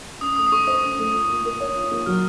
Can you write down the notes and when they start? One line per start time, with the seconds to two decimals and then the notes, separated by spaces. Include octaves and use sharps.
0.21 C#4 D#6
0.36 A3 D#6
0.47 D#6
0.52 A4 C#6
0.67 C5 D#6
0.83 C#4
0.98 A3
1.14 F4
1.29 A#3
1.45 A#4
1.60 C#5
1.76 F4
1.91 A#3
2.06 F#3 F6